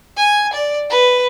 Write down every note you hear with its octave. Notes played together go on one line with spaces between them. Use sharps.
G#5
D5
B4